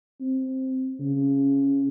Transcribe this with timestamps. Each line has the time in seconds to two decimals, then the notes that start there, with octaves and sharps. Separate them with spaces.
0.21 C4
1.00 C#3